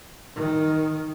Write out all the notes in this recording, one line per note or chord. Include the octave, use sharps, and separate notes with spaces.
D#3